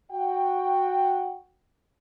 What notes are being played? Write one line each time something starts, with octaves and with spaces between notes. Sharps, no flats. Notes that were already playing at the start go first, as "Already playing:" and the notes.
F#4 F#5 G5